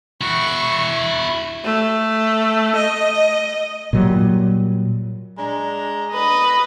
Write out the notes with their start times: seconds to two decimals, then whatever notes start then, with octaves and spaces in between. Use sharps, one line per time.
0.21 E4 F#4 C#6
1.65 A3
2.76 D#5
3.93 A#2 F#3 G3
5.38 G#3 D4 A#5
6.11 B4 D#5